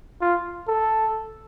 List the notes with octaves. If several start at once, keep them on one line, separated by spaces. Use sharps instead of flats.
F4
A4